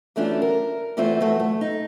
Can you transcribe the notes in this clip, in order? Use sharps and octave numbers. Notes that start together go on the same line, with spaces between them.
E3 F#3 A3 C#4 D4 F4
A#4
E2 E3 A3 C4 F4 C5
E3 F#3 A3
A3
D#4